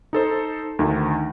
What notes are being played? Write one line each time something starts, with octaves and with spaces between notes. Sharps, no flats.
D#4 A4 C5
D2 D#3